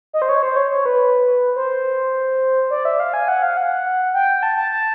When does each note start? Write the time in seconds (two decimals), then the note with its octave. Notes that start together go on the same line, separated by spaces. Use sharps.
0.13 D#5
0.22 C5
0.29 C#5
0.43 C5
0.57 C#5
0.71 C#5
0.86 B4
1.56 C5
2.71 D5
2.85 E5
3.00 F5
3.14 G#5
3.28 F#5
3.43 F5
3.57 F#5
4.14 G5
4.43 A5
4.56 A5
4.71 A5